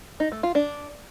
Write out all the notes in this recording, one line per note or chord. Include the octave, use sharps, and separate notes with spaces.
D#4
A3
F4
D4